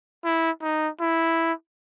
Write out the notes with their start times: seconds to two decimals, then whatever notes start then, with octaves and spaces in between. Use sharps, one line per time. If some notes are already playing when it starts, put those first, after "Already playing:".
0.25 E4
0.63 D#4
1.00 E4